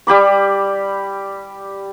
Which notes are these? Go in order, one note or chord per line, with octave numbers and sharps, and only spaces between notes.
G3 G4 B5 D6